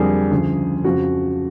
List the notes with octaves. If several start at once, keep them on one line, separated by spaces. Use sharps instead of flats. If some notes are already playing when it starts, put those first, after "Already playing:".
Already playing: F2 D3 G3 A#3 G#4
D2 C#3 F3
F2 C#3 F3 F#4